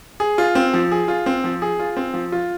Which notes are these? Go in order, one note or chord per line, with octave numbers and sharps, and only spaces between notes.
G#4
F4
C4
F3
G#4
F4
C4
F3
G#4
F4
C4
F3
F4